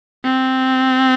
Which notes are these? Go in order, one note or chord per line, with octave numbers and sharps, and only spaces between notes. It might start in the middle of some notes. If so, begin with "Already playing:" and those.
C4